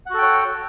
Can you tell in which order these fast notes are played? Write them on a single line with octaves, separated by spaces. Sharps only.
F#5 F#4 A4 G5 C#5